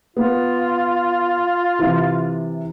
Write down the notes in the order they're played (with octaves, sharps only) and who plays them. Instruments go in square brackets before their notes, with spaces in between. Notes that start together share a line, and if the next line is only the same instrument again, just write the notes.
[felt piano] B3 [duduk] F4
[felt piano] C3 E3